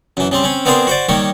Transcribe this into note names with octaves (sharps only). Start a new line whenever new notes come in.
F#2 E3
C#3 G3 C4
C4 C#4
B3 C4 D4 G#4 A#4 C5
F#4 C5 D5
D#3 G3 A#3 C#5